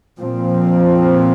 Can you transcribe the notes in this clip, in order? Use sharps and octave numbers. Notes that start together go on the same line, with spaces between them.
A#2 F3 C4